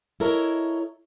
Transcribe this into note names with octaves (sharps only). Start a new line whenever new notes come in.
E4 A4 A#4 C#5 D#5